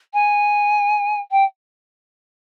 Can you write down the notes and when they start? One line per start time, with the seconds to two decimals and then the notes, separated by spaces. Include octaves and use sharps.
0.14 G#5
1.31 G5